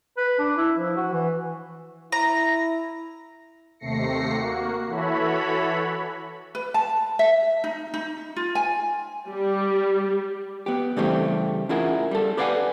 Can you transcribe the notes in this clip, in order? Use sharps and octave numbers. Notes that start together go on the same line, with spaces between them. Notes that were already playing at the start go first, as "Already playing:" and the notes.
B4
D4
E4
F3
F#4
E3
E4 A#5
D#2 C3 A3 A#6 C7 C#7
A#3 F#4
E3 E4 F#4 A4 C#5 B5
B4
A5
E5
D#4
D#4
F4
G#5
G3
B3 G4
C#3 E3 G3 A3 C4 G4
C#4 E4 F4 G#4 A#4 F#5
G3 A4
G4 B4 D5 F5 F#5 G#5